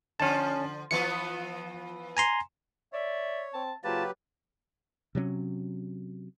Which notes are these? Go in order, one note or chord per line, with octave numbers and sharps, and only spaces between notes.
D3 F3 C#4 A5
E3 F3 B3 C#7
G#5 A#5 C6
C#5 D5 E5
C4 A5
G#2 C#3 F#3 A#3 F4 G4 B4 A5
C3 F#3 C4 C#4